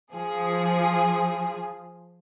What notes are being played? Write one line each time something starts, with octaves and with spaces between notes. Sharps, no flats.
F3 G#4